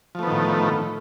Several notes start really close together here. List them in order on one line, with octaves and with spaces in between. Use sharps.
F3 A3 B3 D#3 A2